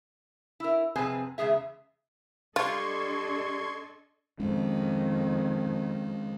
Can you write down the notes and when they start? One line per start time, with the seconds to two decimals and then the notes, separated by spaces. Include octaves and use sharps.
0.60 E4 A#4
0.96 F2 C3 C4 G#4 B4 G#5
1.38 E2 C#3 G#3 G#4 E5
2.56 G3 D4 F4 A4 D#5 C6 C#6 G#6
4.40 F2 D#3 G#3 C#4